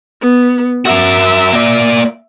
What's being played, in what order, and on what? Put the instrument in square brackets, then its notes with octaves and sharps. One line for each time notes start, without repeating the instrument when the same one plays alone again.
[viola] B3
[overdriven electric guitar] F#4 A#4 [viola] E5
[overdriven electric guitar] A#3 D5